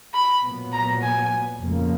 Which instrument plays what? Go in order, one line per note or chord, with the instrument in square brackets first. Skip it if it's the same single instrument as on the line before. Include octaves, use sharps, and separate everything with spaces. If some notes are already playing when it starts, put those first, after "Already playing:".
[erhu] B5
[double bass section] A#2 F#3 B3
[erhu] A#5
G#5
[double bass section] F2 C#3 F3 A#3